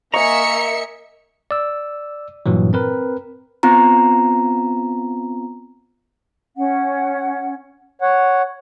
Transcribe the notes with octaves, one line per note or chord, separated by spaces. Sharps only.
A#3 D#5 E5 G#5 A#5 C#6 C#7
D5 E6
G2 A#2 E3 F#3
C4 A#4 B4
B3 C4 F4 A#5
C#4 F#5
C#5 F#5